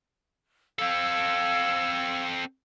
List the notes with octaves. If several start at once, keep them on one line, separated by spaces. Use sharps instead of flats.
C4 A4 F5 E6 G#6